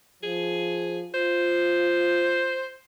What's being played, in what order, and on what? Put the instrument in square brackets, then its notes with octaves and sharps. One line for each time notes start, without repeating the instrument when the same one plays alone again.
[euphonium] F3 [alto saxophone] G#4
[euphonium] F4 [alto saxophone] C5